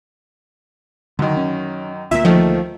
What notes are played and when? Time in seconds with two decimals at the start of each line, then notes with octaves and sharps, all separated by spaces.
1.19 F#2 D3 D#3
1.37 C#4
2.11 D2 A#2 A#3 E5
2.25 D#3 F3 A3